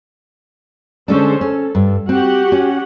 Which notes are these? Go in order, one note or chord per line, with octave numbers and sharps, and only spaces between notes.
D3 G#3 C#4 D4 A4 C5
C#4 A4
G2
C4 F#4 G4 F#5
C#4